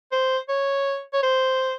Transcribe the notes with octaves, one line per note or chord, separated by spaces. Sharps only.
C5
C#5
C#5
C5